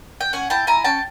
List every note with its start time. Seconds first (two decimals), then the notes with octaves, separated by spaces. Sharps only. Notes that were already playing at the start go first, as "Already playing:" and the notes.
0.21 G5
0.33 C#4 F#5 G#5
0.50 E4 G5 A5
0.67 E4 G#5 A#5
0.84 C#4 G5 A5